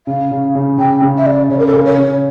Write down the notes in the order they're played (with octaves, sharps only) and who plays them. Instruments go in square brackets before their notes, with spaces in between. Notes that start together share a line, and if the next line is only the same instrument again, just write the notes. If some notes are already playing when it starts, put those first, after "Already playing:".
[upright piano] C#3 [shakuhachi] F5
[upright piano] C#3
C#3
[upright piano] C#3 [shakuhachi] G5
[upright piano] C#3
[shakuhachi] E5
[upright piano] C#3 [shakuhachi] D5
[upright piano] C#3 [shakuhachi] C#5
[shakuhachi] A#4
A4
[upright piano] C#3 [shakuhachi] A#4
[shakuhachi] C#5
[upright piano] C#3